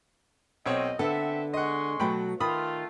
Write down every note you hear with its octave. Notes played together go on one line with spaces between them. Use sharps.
B1 C4 C#5 D#5
D3 B3 C4 A4 E5
G#3 D#5 F#5 C6 C#6
B2 F#3 A3 G5 B5
D#3 A3 F4 B5 D#6